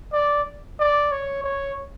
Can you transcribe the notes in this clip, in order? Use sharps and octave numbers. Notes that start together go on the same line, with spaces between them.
D5
D5
C#5
C#5